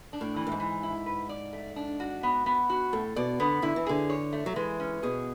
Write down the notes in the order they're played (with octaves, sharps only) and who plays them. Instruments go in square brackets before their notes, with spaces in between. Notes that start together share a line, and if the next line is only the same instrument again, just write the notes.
[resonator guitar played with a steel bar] D4
[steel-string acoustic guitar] A2
[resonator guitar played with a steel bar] E3
[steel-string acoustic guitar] A2
G#2
[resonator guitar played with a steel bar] E3
E4
B4
D5
A3
D4
F#4
B3
B3
F#4
[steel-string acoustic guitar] A2 [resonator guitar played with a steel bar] A4
[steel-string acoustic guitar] B2 [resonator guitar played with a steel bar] D5
[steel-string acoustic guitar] D3 [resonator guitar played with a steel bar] B3
[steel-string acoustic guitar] D3 [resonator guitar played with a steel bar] E4
[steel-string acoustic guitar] E3
[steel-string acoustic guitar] D3 [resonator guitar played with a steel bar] G#4
[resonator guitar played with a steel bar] C#5
A3
[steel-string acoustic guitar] F#3
[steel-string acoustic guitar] E3 [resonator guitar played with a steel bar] G#3
[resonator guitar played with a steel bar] C#4
[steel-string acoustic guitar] B2 [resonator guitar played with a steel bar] G#4